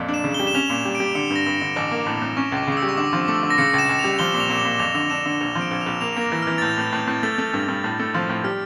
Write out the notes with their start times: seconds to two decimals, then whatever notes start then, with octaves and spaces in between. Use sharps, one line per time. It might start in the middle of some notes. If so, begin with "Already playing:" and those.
Already playing: F2 A#2
0.08 D4
0.14 E7
0.24 C#3
0.34 G7
0.39 G3
0.47 E7
0.55 C#4 F7
0.70 A#2
0.75 E7
0.85 G3
0.95 D7
1.00 G3
1.15 D3 C#7
1.30 G2
1.36 A#6
1.46 G2
1.62 D3
1.76 A1 D6
1.91 A#3
2.07 A2
2.22 A2
2.37 C#4 C#6
2.52 C#2 D6
2.67 C#3 D6
2.77 E6
2.82 G3
2.89 C#6
2.97 D3 D6
3.13 F3
3.28 A3 D6
3.43 D3
3.50 A#6
3.58 C#3 C#7
3.74 C#2
3.79 E7
3.89 C#2
3.99 F7
4.04 G3
4.19 F3 G7
4.34 A#2
4.40 F7
4.50 A#2
4.59 G7
4.65 A#2
4.79 F2 F7
4.95 D3 F7
5.10 D4 E7
5.26 D3 F7
5.41 A#1 F7
5.55 F3
5.61 D7
5.71 A#1
5.81 F7
5.86 A#1
6.01 A#3 F7
6.17 A#3 A#6
6.32 E3
6.42 E3 F6
6.58 A6
6.62 A2 G6
6.78 A2
6.93 A2
7.08 A2
7.23 A3 A6
7.38 A3
7.54 G2
7.68 G2
7.84 A2
7.99 A3
8.14 F3
8.29 A2
8.44 G3 F6